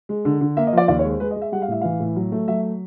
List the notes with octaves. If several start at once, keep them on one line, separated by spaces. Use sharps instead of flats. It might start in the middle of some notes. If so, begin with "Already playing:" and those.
G#3
D3
D3
A#3 E5
D#5
F3 D5
D#2 D5
C#5
G#3
C5
G#3 B4
D#5
G#3
E5
G3 F#5
F5
A2 E5
E3 F5
A2
F#3
A3
F#3 E5